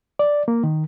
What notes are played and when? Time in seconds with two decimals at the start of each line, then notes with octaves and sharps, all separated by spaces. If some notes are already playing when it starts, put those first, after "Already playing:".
0.19 D5
0.48 A#3
0.64 D#3